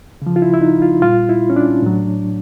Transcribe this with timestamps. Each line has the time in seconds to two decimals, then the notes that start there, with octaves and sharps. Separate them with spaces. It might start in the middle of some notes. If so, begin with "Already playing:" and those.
0.22 C#3 F3
0.36 F4
0.42 E4
0.54 E4
0.61 D#4
0.82 F4
1.02 A#2 G3 F4
1.29 E4
1.50 C#4
1.56 D4
1.82 A2 F#3